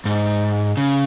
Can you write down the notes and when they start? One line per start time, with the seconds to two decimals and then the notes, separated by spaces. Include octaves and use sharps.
0.05 G#2
0.77 C#3